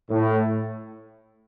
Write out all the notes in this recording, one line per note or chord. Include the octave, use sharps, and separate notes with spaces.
A2